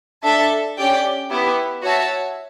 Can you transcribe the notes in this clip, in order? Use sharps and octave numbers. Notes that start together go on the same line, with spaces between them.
D4 A4 E5 A5
C#4 G4 D5 G5
B3 E4 G4
F#4 C#5 E5 A5